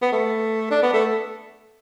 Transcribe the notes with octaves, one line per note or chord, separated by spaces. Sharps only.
B3
A3
D4
B3
A3